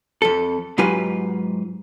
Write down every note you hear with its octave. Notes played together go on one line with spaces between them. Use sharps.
F2 A4
G#2 F#3 F4 G4 B4 G#5